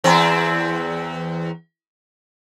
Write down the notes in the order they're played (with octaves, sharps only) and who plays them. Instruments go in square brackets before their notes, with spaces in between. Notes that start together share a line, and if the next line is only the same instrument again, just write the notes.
[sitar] E2 C4